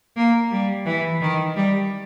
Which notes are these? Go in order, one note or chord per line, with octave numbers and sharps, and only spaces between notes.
A#3
G3
E3
D#3
G3